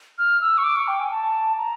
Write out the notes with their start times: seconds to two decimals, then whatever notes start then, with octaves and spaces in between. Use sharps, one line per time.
0.18 F6
0.41 E6
0.58 C#6
0.64 D6
0.76 C#6
0.88 G5
0.99 G#5
1.11 A5
1.58 A#5